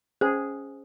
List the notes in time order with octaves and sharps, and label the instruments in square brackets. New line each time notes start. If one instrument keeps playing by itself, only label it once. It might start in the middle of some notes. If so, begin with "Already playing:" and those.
[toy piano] C#4 C5 [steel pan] G#4